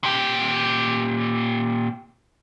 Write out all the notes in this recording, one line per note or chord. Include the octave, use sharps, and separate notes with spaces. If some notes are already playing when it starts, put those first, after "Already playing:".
A#2 G4